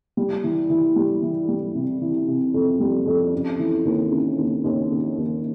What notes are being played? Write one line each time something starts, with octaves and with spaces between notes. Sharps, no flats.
G3
E3
E3
G3
E3
G3
C3
E3
C3
F2
G3
F2
C#3
E3
D#2
C#3
D#2
D#2
C#3
D#2